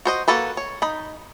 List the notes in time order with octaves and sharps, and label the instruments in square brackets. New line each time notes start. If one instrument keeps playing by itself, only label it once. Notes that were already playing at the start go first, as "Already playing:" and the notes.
[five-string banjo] F#4 C5 D#5
A#3 F#4 A4 B4
C#5
D#4 B5